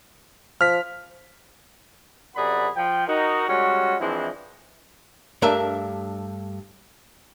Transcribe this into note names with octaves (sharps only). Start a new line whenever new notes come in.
F3 F6 B6
F#2 C3 G#4 D5 F#5 B5
F3 G5
D#4 F#4 A#4
G3 G#3 C#4 F#4
E3 F3 G#3 C4 D4 E4
G2 A3 D4 A#4 E5